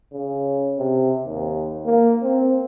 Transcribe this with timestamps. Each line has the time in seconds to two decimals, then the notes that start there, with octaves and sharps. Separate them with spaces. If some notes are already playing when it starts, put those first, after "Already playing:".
0.13 C#3
0.78 C3
1.26 D#2
1.86 A#3
2.22 C4